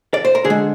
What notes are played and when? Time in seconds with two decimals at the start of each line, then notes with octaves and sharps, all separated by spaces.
0.14 D5
0.25 C5
0.35 A#4
0.44 D3 G#4
0.50 G#3